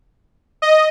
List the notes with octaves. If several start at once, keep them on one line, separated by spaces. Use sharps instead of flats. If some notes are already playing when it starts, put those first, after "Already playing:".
D#5